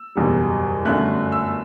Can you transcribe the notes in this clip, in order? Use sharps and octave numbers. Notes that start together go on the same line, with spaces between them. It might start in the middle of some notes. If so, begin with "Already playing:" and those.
Already playing: E6
F#1 E2 B2 G3
G1 F#2 F#3 A3 F#6
E6